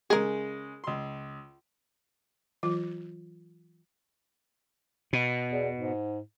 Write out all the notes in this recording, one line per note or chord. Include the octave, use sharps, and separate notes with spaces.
C#3 G#3 G#4 A#4
C#2 C6
E3 F#3 F4
B2
E2
G#2